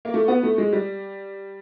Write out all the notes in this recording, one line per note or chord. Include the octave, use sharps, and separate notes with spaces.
A#3
A3
B3
A3
G#3
G3